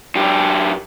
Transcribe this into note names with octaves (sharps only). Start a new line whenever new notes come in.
F#2 G4